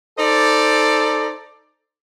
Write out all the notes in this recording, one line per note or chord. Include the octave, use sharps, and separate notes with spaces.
D#4 A4 C5 D5